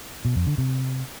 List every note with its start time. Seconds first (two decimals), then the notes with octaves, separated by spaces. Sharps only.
0.25 B2
0.36 F2
0.47 D3
0.58 C3